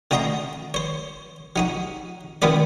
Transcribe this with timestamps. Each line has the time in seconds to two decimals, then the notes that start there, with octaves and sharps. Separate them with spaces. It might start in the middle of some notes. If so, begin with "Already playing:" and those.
0.11 D3 A3 F#4 D#5 A#5 C6
0.74 C5 C#5
1.56 F#3 D#4 F#4
2.42 B2 D#3 E3 B3 B4 D5